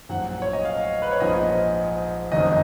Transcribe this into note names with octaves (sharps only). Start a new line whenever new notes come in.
A#1 G#2 F#3 F#5
C#5
D#5
F5
B4
C#5
A#1 G#2 F3 D#5
F#1 F2 D#3 F#3 D#5